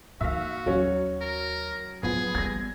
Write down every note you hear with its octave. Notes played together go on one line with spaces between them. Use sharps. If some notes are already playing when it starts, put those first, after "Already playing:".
A#2 D#3 F#4 E5 F5
D#2 F#3 C#4
A#4
F3 F#3 B3 G#4
G3 B3 G#6 A#6